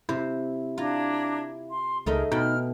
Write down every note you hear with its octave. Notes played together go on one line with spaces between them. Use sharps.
C3 E4 C5
D4 F4 A#5 G#6
C6
C#2 A3 D#4 G#4 A#4 D#5
B2 D#4 G5 B5 F6